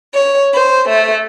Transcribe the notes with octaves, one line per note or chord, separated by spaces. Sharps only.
C#5
C5
A3